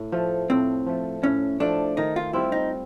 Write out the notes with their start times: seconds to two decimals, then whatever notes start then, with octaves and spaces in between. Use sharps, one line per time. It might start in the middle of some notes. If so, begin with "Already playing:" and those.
Already playing: A2
0.12 F3 A3
0.50 A2 C4
0.86 F3 A3
1.23 A2 C#4
1.60 F3 A3 D4
1.97 D#3 D#4
2.16 F4
2.33 G3 C4 E4 F4
2.52 D#4